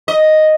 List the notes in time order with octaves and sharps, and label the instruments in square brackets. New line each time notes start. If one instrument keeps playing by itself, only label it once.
[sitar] D#5